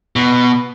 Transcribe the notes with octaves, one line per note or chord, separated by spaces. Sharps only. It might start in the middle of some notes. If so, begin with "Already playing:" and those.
B2